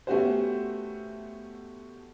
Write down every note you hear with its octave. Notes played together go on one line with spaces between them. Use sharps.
A3 B3 C#4 F#4 G4 C5